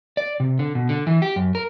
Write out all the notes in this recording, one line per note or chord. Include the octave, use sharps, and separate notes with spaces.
D5
C3
D3
B2
D3
E3
G4
F#2
A#4